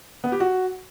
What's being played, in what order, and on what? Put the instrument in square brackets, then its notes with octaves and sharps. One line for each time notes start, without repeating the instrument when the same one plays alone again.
[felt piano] B3
G4
F#4